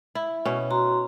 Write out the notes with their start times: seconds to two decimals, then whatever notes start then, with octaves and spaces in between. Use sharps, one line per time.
0.15 E4
0.45 B2 C#4
0.71 F#4 A#5 C6